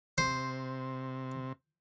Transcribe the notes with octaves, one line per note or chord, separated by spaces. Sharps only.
C3 C5